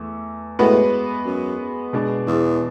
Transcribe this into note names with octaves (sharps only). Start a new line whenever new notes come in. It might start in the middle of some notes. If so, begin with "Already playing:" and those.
Already playing: E2 A3
A2 G#3 B3 F#4 B4
F#2
B2 G#3 D4
E2